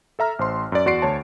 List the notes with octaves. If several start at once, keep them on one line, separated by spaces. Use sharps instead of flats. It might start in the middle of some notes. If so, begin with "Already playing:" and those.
A4 E5 A#5 F6
A1 C5 C6
F#2 D5
E2 F#4 D5 C6 C7 D7
D2 C#5 A5